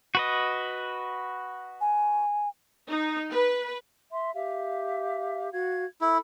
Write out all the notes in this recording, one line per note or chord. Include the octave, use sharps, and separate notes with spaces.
F#4 B4 D#5
G#5
D#4
B4
E5 C6
G4 E5 F5
F#4 F5 G#6
E4 A4 B5